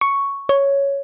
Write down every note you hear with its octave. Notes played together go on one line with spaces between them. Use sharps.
C#6
C#5